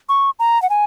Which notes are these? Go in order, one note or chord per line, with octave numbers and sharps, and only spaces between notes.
C#6
A#5
F#5
G#5